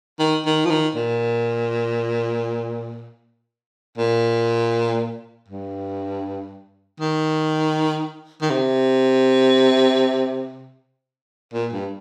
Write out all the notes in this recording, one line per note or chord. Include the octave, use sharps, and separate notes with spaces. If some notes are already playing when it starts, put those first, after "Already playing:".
D#3
D#3
F3
D#3
A#2
A#2
G2
D#3
D#3
C3
A#2
G2